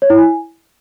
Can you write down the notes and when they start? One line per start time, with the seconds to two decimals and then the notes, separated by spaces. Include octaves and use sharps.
0.02 C#5
0.10 E4
0.18 G#5